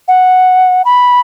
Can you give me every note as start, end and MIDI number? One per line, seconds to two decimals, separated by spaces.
0.08 0.82 78
0.85 1.20 83